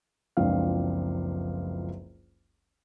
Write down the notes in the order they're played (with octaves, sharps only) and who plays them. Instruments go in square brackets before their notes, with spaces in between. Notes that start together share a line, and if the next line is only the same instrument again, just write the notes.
[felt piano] F#1 C#2 F3 C4 D4 F5